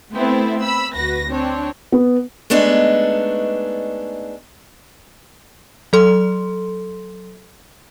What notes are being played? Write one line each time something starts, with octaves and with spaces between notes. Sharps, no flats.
A3 B3 C4 E4 A4
B5 E6
D2 F#4 B4 A#6
C4 D4 C#5
B3
G#3 A3 B3 D4 D#4
F#3 A4 C6